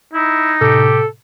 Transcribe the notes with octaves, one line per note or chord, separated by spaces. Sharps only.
D#4 E4
A2 C3 G4 A4